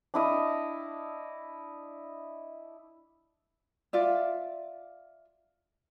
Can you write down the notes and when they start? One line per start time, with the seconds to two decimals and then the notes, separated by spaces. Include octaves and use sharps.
0.14 D4 E4 D#5 F5
3.93 F4 D5 E5